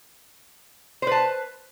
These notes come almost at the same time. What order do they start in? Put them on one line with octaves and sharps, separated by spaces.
C5 B4 A5